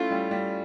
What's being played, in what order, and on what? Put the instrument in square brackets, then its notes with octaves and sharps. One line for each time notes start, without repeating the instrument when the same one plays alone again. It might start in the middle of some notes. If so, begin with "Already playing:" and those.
Already playing: [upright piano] A3 C#4 E4 [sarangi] F4
[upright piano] G3
G3